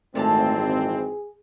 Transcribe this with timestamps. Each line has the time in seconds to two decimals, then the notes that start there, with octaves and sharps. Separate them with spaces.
0.15 G#1 F2 A#2 E3 G#3 A3 C4 A5
0.59 G#4